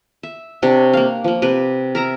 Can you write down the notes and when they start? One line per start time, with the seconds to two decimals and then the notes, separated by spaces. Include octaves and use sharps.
0.23 E5
0.62 C3 D4 G4 C#5
0.93 A#3 F5
1.24 F3 A#3
1.42 C3 G4 B4
1.95 A#4 E5 A#5